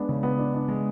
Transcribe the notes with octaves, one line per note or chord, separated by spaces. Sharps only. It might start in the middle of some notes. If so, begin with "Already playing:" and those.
Already playing: G#3 B3 D4
C#3
B3
D4
D4
G#3